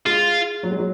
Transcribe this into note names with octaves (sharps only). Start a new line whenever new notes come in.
G#3 F4
F#3
G#3
F#3